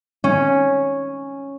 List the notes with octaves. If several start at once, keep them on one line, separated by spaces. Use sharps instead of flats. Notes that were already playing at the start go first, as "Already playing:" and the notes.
C#4